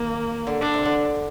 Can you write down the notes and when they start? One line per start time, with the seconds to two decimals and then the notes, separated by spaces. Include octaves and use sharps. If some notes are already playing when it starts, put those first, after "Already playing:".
Already playing: D#3 A#3
0.47 D3
0.62 D3 D4
0.74 C3
0.85 D3